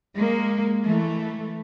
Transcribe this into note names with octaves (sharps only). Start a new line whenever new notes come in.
G#3 A#3
E3 A3